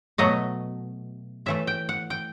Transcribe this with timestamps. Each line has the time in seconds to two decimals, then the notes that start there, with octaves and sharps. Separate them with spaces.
0.18 B2 F#3 A3 D#5
1.46 A2 E3 A3 E5
1.67 G5
1.89 F#5
2.10 G5